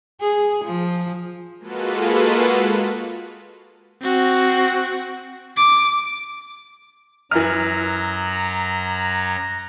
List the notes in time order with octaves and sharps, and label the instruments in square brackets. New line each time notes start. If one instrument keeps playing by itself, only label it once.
[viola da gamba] G#4
F3
[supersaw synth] G#3 A#3 F4 F#4 A4 B4
[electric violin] C4 F#4
D6
[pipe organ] F#2 F#3 [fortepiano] E3 F6 [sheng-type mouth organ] A#5